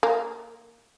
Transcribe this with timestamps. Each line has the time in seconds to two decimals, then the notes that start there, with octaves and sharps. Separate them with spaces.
0.03 A#3